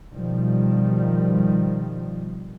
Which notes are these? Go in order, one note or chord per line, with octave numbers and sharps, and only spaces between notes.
B2 D#3 F3 G3